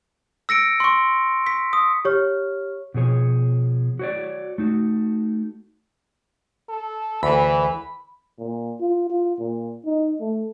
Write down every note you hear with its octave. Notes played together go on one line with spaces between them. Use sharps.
E6 A#6 C#7 D7
C6 C#6
B6
D#6
G4 C#5 C#6 F6
B2 F3 G#4 C#5
F#4 C#5 D5
A3 D#4 F#4
A4
D2 E3 B5
A#2
F4
F4
A#2
D#4
A3